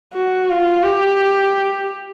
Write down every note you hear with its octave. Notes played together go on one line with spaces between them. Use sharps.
F#4
F4
G4